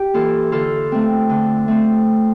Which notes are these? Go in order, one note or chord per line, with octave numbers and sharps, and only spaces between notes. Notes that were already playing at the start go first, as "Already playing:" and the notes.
Already playing: G4
E3 A#3 F4 A4
D3 F4 A4
A3 C4
D3
A3 C4